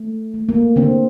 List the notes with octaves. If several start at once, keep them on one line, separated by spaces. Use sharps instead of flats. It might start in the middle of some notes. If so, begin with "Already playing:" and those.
Already playing: A3
A3
A#3
D3 C4